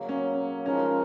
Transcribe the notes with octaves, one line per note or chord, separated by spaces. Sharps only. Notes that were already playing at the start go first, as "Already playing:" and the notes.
Already playing: C#3 F#3 A#3
C#4
C#3 F3 G#3 C#4 D#4 A#4